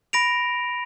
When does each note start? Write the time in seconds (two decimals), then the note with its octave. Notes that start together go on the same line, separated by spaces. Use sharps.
0.13 B5 A#6 D7 F7